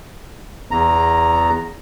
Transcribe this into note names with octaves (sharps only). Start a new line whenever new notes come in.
E2 A#5